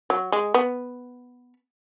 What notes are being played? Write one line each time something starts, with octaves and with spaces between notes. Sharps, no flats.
F#3
G#3
B3